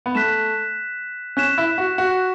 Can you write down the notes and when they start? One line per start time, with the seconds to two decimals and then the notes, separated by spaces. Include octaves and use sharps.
0.06 B3
0.15 A3 F#6 B6 E7
1.37 C#4 F#6 B6 E7
1.58 E4
1.78 F#4
1.98 F#4